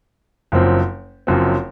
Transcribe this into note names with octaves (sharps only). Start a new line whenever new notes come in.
F#1 F#2 F3 C4
F#1 F#2 F3 C4